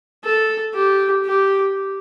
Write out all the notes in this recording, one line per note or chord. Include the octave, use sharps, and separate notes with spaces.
A4
G4
G4